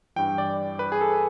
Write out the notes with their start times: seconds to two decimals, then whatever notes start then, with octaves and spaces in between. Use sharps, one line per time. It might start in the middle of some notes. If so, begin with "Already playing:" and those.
0.16 G2 E3 G5
0.38 D5
0.79 B4
0.92 G#4
1.01 A4